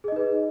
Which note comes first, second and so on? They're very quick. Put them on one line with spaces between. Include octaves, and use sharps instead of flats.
G#4 D#5 D#4 B4